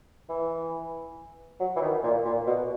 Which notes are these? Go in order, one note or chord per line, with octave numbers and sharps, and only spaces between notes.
E3
F#3
E3
D#3
A#2
A#2
B2